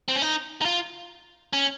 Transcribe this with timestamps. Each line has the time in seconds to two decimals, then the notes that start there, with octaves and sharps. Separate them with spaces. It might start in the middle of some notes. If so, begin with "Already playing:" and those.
0.08 C4
0.16 C#4
0.22 D#4
0.61 D#4
0.65 F4
1.53 C#4